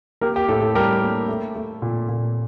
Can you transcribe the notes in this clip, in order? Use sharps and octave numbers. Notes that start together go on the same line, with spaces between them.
A#3 G4 A#4
G4
A2 A4
A4
G3 G4 A#4
A#3
A3
A3
A#2
A#2